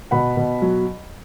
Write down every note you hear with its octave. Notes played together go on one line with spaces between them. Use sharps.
B2 F#5 B5
B2
F#3